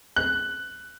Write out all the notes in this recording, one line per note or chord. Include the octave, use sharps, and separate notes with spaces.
F#6